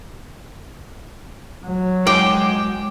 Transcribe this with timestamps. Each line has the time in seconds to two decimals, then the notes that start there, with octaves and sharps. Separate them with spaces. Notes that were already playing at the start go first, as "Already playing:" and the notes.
1.65 F#3
2.07 G#3 G5 C6 D6